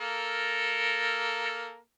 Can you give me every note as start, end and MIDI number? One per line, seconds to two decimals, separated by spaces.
0.01 1.78 58
0.01 1.78 69
0.01 1.78 70